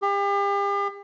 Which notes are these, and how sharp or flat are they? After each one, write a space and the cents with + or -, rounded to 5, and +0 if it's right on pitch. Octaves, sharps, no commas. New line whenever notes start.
G4 +40